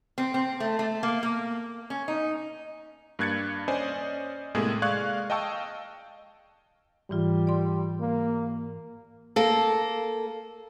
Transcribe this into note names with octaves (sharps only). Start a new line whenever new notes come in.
C4
C4
A3
A3
A#3
A#3
C#4
D#4
G2 A#3 F#6 G#6 A6 C#7
C#4 C5 D5 D#5 G#5
A2 C3 G#3 A#3 G#4 A4
G#3 D5 F5 C#6 F#6 G#6
D#5 F5 G5 A5 C#6 E6
G#2 E3 G3 F4
D5 C6
A#3
A#3 A4